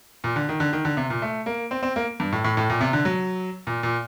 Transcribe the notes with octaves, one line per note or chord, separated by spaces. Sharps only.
A#2
D3
D#3
D3
D#3
D3
C3
A#2
A3
A#3
C4
C4
A#3
G2
A2
A2
A2
A#2
C3
D3
F#3
A#2
A#2